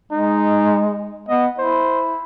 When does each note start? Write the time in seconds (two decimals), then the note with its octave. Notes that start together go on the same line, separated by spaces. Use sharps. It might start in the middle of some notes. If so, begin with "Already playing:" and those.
0.12 G#3 D#4
1.29 B3 D#5
1.58 E4 C5